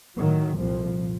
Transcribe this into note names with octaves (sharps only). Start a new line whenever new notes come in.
A2 D#3 F#3
C2 F2 A#2 F3